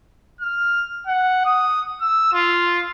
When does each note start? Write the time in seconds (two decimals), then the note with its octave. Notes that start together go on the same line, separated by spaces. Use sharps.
0.41 F6
1.07 F#5
1.45 D#6
2.01 E6
2.33 F4